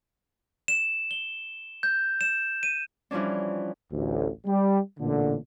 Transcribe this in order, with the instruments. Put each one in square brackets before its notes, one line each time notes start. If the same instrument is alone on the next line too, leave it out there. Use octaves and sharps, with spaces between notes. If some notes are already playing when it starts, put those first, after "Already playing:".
[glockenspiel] E7
G7
G6
E7
D#7
[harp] E3 F3 G3 C#4 D4
[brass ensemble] A1 D2
G3
A1 A#2 D3